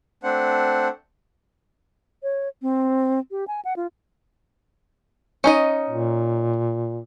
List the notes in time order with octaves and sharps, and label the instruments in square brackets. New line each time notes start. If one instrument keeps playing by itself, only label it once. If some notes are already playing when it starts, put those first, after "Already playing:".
[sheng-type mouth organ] A3 C4 D4 C5 F#5
[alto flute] C#5
C4
G4
G#5
F#5
F4
[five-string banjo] C#4 D#4 D#5
[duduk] A#2